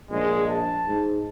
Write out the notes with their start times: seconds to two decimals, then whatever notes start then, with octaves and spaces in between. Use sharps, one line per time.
0.11 A#1 G#3
0.50 A5
0.88 G#2